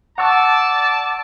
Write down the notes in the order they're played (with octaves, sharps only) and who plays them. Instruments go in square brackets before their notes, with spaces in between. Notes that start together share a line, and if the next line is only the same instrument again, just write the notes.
[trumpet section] D5 A5 [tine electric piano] F#5 C#6 E6